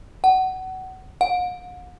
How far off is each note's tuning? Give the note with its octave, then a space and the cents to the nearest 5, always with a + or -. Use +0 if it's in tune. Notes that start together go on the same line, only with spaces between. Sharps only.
F#5 +25
F#5 -45